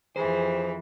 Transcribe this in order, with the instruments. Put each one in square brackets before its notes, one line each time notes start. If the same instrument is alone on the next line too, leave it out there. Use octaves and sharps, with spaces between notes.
[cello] F2 E3 [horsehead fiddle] G4 G#4 [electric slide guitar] C5